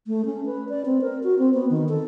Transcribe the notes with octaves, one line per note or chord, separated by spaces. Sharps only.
A3
C#4
B4
D5
C4
A#4
F#4
C4
B3
D#3
A4